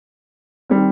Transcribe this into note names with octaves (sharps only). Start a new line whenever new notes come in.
D#3 G3 C4